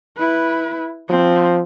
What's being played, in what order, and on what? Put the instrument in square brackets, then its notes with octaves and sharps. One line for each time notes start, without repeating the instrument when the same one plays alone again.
[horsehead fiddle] E4 B4
[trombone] F3 [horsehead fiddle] C4